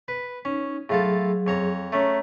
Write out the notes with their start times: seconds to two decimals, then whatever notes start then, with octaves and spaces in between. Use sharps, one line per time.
0.08 B4
0.45 C#4 D#4
0.89 A2 F#3 F4 G#4 A4
1.47 F2 C#5 A#5
1.92 A3 C#4 C#5 A#5